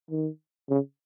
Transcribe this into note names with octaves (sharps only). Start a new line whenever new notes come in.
D#3
C#3